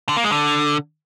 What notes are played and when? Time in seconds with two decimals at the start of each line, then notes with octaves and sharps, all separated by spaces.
0.09 D3
0.16 A#3
0.24 G#3
0.32 D3